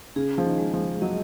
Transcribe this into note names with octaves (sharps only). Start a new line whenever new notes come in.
C#3 G#4
F3
D#3
G#3
F3
F#3 D#5